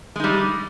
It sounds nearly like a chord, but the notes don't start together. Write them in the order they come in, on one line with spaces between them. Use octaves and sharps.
G#3 D#4 G3